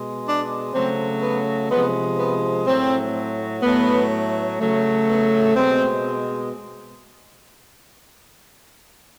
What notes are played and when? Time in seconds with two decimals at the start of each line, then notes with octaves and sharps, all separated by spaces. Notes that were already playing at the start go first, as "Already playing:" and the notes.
Already playing: B2 G#3
0.27 D4
0.74 C#3 F#3 A3 C4
1.22 B3
1.71 C3 F3 G#3 B3
2.18 B3
2.67 A2 F#3 A3 C4
3.63 A2 F#3 A3 B3
4.60 C#3 F#3 A3
5.07 B3
5.56 B2 G#3 C4